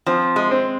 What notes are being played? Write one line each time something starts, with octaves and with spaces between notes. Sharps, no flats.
F3 C4
G#3
C4